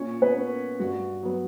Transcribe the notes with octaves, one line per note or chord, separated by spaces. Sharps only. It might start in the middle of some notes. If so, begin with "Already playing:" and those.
Already playing: A#2 C#4 C#5
B3 B4
A#3 C#4
G2 F#4
F#3 B3